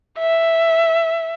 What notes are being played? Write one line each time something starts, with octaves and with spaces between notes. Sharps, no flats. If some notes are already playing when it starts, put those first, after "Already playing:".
E5